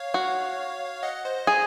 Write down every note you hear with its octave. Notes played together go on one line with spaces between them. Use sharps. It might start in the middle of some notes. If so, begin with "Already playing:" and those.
Already playing: C#5 F5
F#4
D#5 F#5
C5 D#5
G#4